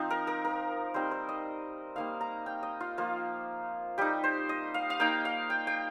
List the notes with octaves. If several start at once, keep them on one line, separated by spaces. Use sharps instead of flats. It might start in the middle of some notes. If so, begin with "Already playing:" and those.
Already playing: F3 C4 D#4
A#4
A#4
A#4
G3 C4 D#4 C5
C5
D#5
G3 A#3 D#4 F5
A#5
G5
D#5
F4
F3 A#3 F4
G3 D#4 G4
C5
D#5
F5
F5
A#3 D#4 G5
F5
G5
G5